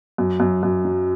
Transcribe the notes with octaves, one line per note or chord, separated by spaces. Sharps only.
F#2
F#2
F#2
F#3